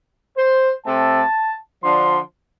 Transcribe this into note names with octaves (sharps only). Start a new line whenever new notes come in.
C5
C3 A3 C4 A5
D3 F3 D4 C6